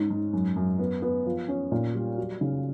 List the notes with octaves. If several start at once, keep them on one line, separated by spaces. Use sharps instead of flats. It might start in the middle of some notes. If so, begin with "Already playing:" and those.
Already playing: G#2 C#4
G#2
F#2
F#2
B3
B3
F3
C#4
A#2
G3
F#3
C#3